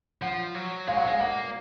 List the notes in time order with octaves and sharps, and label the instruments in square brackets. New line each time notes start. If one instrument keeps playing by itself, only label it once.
[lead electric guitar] F3 [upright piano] F#5
[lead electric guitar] F#3
[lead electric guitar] G#3 [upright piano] F5
[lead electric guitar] F#3 [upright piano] F#5
[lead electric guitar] G#3 [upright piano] F5
[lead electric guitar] A#3 [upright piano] F#5